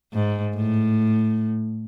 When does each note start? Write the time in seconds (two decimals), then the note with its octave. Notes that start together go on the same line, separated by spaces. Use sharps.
0.13 G#2
0.55 A2